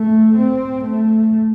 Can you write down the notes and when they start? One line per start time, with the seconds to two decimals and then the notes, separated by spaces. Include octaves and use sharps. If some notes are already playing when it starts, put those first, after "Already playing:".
Already playing: A3
0.36 C4
0.85 A3